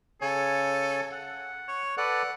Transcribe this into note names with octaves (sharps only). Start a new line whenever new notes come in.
C#3 A4 C#5 G#5
F#5
C#5
A4 B4 D5 F#5